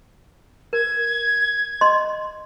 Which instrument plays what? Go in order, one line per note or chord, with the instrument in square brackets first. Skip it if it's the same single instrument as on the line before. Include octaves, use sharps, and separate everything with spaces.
[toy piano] A#4 [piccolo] G#6
[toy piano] D#5 C6